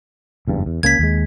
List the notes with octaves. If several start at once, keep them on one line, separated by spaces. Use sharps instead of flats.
F#1 E2 G2
E2
C#2 A#3 C#4 G#6 B6
D#2 G#3